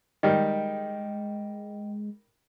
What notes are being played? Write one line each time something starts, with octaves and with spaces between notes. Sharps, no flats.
D#3 G3 G#3 D#5 G5